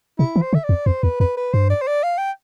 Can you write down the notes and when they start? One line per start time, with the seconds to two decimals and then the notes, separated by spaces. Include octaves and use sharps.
0.19 C3 E4
0.36 E3
0.42 C5
0.53 D3 E5
0.64 D5
0.69 F2
0.86 F2 C5
1.03 E2 B4
1.20 F2 B4
1.37 B4
1.54 G2 C5
1.70 D5
1.81 C5
1.88 D5
2.04 F5
2.18 G5